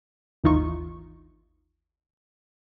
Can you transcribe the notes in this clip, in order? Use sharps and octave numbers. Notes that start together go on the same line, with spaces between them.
G#1 D#2 E3 D#4 F4 C#6